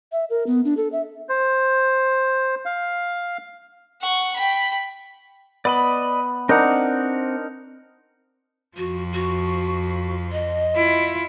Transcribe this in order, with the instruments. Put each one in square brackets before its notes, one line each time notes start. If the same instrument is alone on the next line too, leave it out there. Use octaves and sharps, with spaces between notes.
[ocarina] E5
A#4
B3
D4
A4
E5
[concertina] C5
F5
[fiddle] F#5 C#6
G5 B5
[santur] B3 [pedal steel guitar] D5 D#5 B5
[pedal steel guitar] C4 F#5 [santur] D4 D#4 A#4
[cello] F2 F3 [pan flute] F#4
[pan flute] F#4
D#5
[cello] E4 F4